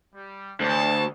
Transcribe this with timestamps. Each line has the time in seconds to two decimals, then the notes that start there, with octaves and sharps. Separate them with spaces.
0.14 G3
0.60 D2 C#5 A5